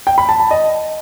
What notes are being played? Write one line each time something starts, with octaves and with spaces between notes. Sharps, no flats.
G5
B5
A5
A5
D#5